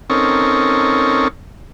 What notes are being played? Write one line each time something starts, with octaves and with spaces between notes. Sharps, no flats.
C4 C#4 D#4 A4 A#4 C#5